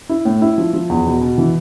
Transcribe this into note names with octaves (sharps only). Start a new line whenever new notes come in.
E4
A2
E4
F3
F3
E2
B2
B2
E3